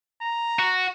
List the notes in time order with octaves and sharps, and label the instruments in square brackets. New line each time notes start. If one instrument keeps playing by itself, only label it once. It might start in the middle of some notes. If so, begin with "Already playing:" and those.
[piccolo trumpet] A#5
[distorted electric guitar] F#4